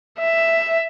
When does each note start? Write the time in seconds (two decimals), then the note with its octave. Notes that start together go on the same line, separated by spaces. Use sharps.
0.19 E5